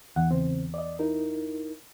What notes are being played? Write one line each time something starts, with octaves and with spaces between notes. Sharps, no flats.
E2 F#5
C#3 C4
D5 D#5
D#4 E4 A#4